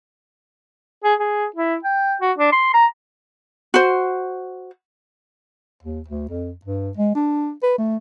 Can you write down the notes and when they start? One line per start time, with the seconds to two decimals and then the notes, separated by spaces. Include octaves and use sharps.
1.04 G#4
1.20 G#4
1.56 E4
1.84 G5
2.21 F#4
2.38 D4
2.52 C6
2.74 A#5
3.74 F#4 C5
5.83 D#2
6.09 D2
6.29 F2
6.65 G2
6.97 G#3
7.15 D4
7.63 B4
7.78 A3